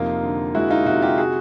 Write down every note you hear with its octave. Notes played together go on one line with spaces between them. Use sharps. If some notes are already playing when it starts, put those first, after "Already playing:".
Already playing: F2 C3 A#3 D#4 F4
D3
G#3 E4 F#4
D#4 F4
C3 E4 F#4
F4 G4
F#4 G#4